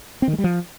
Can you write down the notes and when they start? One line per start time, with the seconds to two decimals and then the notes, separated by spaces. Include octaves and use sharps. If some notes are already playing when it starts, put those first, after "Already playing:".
0.22 C4
0.28 D#3
0.33 G#3
0.38 G3
0.44 F3